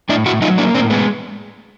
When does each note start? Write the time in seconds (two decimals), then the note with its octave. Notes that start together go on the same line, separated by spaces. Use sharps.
0.09 A2 D4 E4
0.26 A2 E4 F#4
0.42 F#3 D#4 F4
0.58 A#3 D4 E4
0.74 A2 C4 D4
0.90 G#3 B3